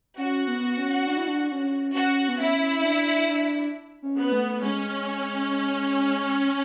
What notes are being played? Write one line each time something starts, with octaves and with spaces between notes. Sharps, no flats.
C#4 F#4
B3
C#4
D4
E4
D4
C#4
C#4 F#4
B3
C#4 E4
C#4
D4
D4
C#4
B3
A3
G#3 C#4